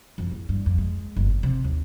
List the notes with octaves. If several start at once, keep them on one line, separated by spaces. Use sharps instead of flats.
F2
E2
G2
F2
G#3
G1
G2
C3
D#2